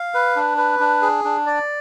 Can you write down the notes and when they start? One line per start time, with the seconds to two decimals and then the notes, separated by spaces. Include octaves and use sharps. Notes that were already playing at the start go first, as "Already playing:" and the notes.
Already playing: F5
0.14 B4
0.36 D4
0.58 B4
0.79 D4
1.02 G#4
1.24 D4
1.46 D5